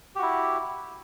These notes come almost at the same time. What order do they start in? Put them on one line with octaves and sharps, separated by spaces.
G4 F#4 E4